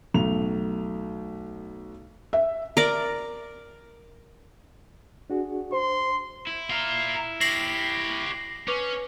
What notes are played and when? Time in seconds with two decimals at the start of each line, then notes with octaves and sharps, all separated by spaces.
0.14 B1 A3 F7
2.33 E5
2.77 A#4 D5
5.30 D4 F#4 G#4
5.73 C5 C6
6.47 E4
6.70 F4 A#4
7.41 G4 C#5 A#6 C7 F#7
8.68 C#4 B4 C#6 D6